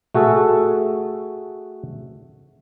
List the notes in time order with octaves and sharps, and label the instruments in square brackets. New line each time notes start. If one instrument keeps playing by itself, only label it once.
[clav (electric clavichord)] A3 F#4 G#4 A4